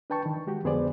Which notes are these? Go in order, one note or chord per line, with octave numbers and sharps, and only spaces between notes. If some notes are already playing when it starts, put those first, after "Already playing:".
D4 B4 G5 A5 C#6
D#3
G#3 F#4 G4
F2 D3 B3 G#4 C5 D5